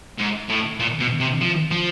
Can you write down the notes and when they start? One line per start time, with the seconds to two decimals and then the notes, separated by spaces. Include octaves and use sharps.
0.18 G#2
0.49 A2
0.80 A#2
1.00 B2
1.20 C3
1.41 F3
1.71 F3